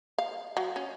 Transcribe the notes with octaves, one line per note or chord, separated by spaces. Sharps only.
F5
F#3
C#4